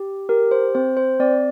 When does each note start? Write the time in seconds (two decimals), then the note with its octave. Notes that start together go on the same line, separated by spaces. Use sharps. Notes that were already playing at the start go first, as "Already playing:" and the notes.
Already playing: G4
0.29 G4 A#4
0.51 C5
0.75 C4 C5
0.97 C5
1.20 C4 D5